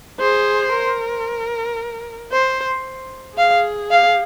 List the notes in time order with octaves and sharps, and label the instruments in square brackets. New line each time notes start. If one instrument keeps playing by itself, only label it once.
[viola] G#4 [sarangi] C5
[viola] A#4
[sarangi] C5
[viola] G#4 [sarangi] F5
[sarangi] F5